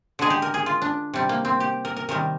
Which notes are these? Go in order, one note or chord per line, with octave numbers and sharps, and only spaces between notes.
D3 G#3 G#4
G4
A#4
G#4
F4
D4
C3 G3
A#3
C4
G4
A#4
A#4
C3 D#3 G3 A#4